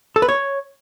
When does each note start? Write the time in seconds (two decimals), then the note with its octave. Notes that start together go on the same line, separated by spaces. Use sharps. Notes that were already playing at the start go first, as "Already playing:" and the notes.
0.16 A4
0.22 B4
0.29 C#5